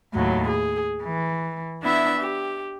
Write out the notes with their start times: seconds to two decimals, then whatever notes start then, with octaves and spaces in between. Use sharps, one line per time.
0.14 D#2 A2 F#3
0.48 G#4
1.02 E3
1.82 B3 D4 E4 E5
2.20 G4